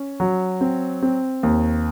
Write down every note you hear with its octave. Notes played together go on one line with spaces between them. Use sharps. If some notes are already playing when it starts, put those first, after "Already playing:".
Already playing: C#4
F#3
C4
C4
D#2